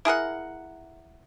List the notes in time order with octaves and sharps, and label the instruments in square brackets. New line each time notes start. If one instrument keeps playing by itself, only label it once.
[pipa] E4 G#4 A#4 F#5